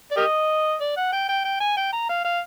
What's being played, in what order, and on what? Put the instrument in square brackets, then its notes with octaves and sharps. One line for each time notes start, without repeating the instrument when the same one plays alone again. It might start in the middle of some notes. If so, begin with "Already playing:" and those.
[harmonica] D5
G4 A#4 D#5
D5
F#5
G5
G5
G5
G#5
G5
A#5
F5
F5